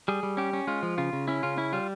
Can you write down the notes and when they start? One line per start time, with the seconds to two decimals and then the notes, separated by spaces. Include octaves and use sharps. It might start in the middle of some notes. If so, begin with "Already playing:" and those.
0.08 G3 G#4
0.23 G3
0.37 C#4 G4
0.53 C#4
0.67 G#3 F4
0.83 F3
0.98 C#3 F4
1.13 C#3
1.28 C#4 E4
1.43 C#3 F4
1.57 C#4 E4
1.73 G3 F4